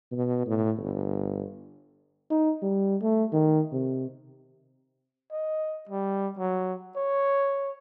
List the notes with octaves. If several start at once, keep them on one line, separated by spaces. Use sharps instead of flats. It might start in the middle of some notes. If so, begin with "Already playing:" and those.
B2
A2
G1
D#4
G3
A3
D#3
C3
D#5
G3
F#3
C#5